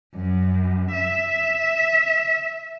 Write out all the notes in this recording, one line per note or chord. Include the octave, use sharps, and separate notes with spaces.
F#2
E5